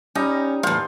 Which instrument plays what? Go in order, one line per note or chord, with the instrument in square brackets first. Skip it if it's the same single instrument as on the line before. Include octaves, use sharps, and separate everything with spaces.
[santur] G3 D#4 A#5 [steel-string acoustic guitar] C#4
[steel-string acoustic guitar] E2 A2 [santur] C5 F5